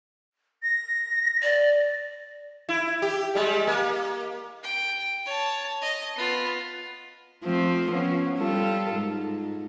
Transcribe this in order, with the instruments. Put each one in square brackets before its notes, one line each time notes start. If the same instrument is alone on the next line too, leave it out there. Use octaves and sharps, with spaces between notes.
[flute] A#6
[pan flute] D5
[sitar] E4
G4
G3 G#3
A#3
[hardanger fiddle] G5
C#5 A5
D#5
B3 F4
[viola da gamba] F3 A3 C4
F3 B3 C#4
G3 F4 A4
G#2